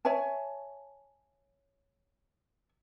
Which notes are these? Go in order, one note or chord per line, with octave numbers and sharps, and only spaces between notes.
C#5 E5 G#5 A5